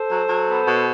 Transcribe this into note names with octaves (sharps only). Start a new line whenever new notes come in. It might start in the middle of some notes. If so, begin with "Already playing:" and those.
Already playing: A4 C5
F#3
F#3
B3
B2